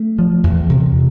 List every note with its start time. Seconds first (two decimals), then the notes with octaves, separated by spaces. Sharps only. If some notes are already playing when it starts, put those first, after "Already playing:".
Already playing: A3
0.19 F3
0.44 E2
0.70 C3